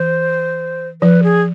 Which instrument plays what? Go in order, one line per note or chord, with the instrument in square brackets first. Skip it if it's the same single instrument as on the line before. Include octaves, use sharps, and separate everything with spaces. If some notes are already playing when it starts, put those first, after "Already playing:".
Already playing: [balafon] E3 [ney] C5
[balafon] F3 [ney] B4
[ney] G#4